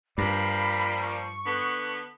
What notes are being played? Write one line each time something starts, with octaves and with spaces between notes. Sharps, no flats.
G2 F3 G3 A#3 B5
C#6
D3 B3